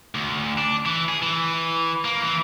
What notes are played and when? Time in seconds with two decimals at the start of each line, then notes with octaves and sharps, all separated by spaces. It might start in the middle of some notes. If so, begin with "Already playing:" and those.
0.15 D2
0.58 D4
0.86 E3
1.09 G#4
1.22 E3
2.05 A#3
2.22 E3